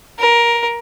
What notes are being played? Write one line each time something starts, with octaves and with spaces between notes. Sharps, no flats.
A#4